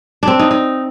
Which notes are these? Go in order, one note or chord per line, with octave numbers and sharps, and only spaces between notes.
C4 D4
D#4
D#4